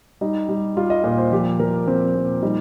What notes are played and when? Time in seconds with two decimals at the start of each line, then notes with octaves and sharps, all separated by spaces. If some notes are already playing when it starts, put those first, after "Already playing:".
0.21 G3 D#4
0.49 G3
0.77 G3 F4
0.90 D#5
1.04 A#2 D#5
1.18 C5
1.32 F3 G4
1.60 F3 A#4
1.87 F3 C4
2.15 A#2
2.42 G3 D#4